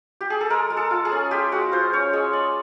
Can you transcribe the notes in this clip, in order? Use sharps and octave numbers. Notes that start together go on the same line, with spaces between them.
G4
G#4
A4
G#3 A#4
G#3
A4
F4
G#4
C#4
G#3 G4
G#3 F#4
F4 C5
C#4 C#5
G#3 D#5
G#3 D5